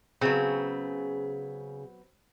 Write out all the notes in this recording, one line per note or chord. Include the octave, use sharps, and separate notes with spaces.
C#3 F#3 B3 C4